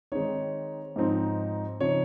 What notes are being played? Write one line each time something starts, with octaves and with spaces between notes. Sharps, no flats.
D#3 G#3 C4 D#4 C#5
G#2 F3 C4 D#4
C#3 F3 C4 D#4 C#5